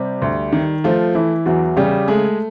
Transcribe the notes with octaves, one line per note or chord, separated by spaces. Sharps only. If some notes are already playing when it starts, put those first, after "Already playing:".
Already playing: C3 G3 G4
D2
D#3
F3 A3 F4
E3 E4
E2 F#3 F#4
C#3 G3 G4
G#3 A3 G#4